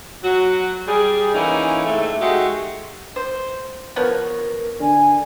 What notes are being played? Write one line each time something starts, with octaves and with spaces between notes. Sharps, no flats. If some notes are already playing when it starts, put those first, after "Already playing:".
F#3 F#4
G3 G#4
E3 A3 A#3 C#4 D#4
G#2 C3 A3
G#3 A3 D#4 F#4 G4
C5
F3 B3 A#4 C#5
D3 G#5